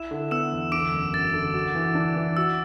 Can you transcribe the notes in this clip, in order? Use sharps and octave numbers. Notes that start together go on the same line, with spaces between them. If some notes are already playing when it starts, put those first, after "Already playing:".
Already playing: E4 E6 E7
D3
B3 E6 E7
E2
D3 D6 D7
F#1
F#2 A6
D3
F#4
E3
D4
E3
F#4 E6